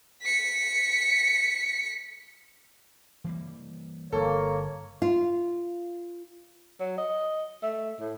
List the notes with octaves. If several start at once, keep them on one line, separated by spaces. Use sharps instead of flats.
B6 C#7
E3 G3 A#3
G1 A#3 A4 C#5
F4
F#3
D#5
A3
A2